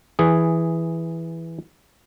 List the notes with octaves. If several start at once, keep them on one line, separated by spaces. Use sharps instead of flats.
E3 G#4